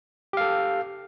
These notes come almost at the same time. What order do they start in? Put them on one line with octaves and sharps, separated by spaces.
G4 F5 A4